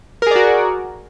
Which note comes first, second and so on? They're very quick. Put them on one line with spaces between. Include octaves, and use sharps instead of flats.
A#4 G#4 D5 F#4